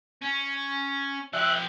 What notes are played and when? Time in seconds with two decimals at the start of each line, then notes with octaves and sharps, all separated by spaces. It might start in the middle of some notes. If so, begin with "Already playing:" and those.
0.22 C#4
1.33 F3 G4 E5 F#6